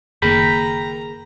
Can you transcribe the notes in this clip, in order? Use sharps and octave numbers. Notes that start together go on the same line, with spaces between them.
F#1 D#3 A#3 G#4 A#4 G5 A#5 B5